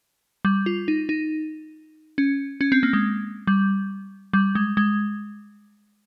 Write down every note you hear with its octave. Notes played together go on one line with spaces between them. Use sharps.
G3
F4
D#4
D#4
C#4
C#4
C4
A#3
G#3
G3
G3
G#3
G#3